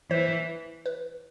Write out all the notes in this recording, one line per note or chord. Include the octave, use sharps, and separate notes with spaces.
E3 C5
B4